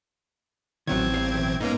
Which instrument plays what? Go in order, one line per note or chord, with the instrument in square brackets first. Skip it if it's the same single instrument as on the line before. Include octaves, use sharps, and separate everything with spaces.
[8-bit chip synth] A1 C4 G#6 [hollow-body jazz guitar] D#3 E3 F#3
[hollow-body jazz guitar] E2 G3 F5
B1 E3
[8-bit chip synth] G#2 A#3 C#4 [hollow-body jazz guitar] B3 D#4